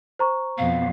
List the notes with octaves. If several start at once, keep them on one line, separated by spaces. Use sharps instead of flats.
C5 A#5 C#6
F2 B2 F5